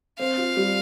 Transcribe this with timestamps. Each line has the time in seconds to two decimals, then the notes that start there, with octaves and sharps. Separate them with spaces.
0.19 C4 F5
0.38 F4
0.57 G3